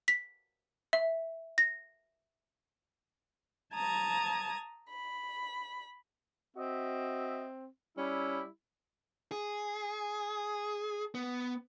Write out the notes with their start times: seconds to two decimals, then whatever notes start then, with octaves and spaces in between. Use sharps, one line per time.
0.08 B6
0.93 E5
1.58 A#6
3.74 A5 A#5 D#6 G#6
4.89 B5
6.56 C4 F#4 D#5 E5
7.97 G3 C#4 E4
9.31 G#4
11.15 B3